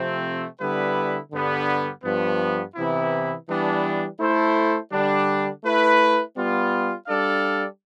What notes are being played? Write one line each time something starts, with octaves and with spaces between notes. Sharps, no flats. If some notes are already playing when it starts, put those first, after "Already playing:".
Already playing: C3 F3 A3 C4
D3 G3 B3 E4 B4
G2 D3 G3 B3
G2 F3 B3
C3 E3 B3 E4
E3 G3 B3 D4
A3 E4 A4 C5
D3 G3 D4
A3 E4 B4
G3 B3 F4
G3 D4 A4 D5 F5